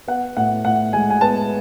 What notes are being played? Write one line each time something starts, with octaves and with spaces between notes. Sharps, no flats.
B3 F#5
A2 F#5
A2 F#5
G#3 G#5
G#5
B3 A5